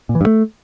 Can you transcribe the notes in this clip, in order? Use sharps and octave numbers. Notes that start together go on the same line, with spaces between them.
A#2
E3
G2
A3